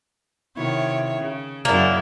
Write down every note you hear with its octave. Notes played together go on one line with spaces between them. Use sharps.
C3 D#3 E4 F#4 C#5
C#3
F#2 C#3 A#3 E4 A#4 D5 G#5